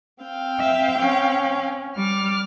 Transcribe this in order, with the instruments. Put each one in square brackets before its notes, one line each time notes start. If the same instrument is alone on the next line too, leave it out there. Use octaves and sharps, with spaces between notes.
[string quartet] C4 F5 G5
[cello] E5
C#4
[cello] G3 [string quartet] D6 F6